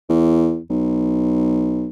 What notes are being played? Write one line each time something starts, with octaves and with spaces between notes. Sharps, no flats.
E2
B1